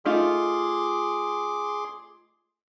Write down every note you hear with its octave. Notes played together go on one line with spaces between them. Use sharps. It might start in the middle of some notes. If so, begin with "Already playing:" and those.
A3 D#4 F4 G#4 C6 D6